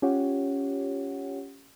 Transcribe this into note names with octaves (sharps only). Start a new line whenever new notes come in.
C#4 F4 G4 C#5 F#5